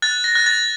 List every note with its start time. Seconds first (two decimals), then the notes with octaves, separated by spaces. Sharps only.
0.02 F#6 A6
0.24 A#6
0.35 F#6
0.46 A6